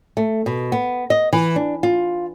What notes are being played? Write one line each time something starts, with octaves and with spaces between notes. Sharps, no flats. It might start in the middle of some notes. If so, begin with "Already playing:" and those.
A3
B2
B3
D#5
E3
D4
F4